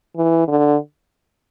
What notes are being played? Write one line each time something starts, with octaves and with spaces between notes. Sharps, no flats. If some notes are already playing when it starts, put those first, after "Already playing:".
E3
D3